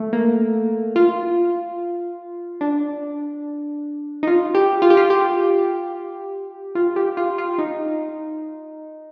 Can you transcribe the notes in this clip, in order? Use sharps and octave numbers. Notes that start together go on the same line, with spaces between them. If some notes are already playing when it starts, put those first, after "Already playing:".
Already playing: A3
A#3
F4
D4
D#4
F4
G4
F4
G4
F4
G4
F4
G4
F4
F4
D#4